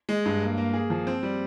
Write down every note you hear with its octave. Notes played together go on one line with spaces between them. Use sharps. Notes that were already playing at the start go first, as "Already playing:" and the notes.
G#3
G2
A#3
A#3
G#4
F3
C4
G3